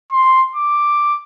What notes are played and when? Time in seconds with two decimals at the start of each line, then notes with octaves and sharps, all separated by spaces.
0.12 C6
0.56 D6